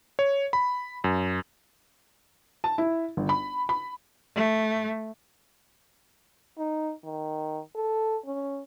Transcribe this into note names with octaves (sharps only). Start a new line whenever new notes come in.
C#5
B5
F#2
A5
E4
G1
B5
B5
A3
D#4
D#3
A4
C#4